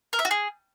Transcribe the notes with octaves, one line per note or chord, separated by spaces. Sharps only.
A#4
E5
F#4
G#4